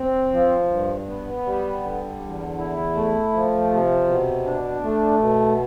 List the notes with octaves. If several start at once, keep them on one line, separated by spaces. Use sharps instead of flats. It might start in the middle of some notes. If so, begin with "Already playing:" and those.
Already playing: C4
F3
G2
B3
G3
D3
E2
E4
A3
F3
C3
B2
D4
A3
B2